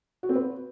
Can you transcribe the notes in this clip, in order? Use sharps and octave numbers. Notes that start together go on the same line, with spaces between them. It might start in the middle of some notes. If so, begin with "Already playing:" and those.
F#4
C4
B4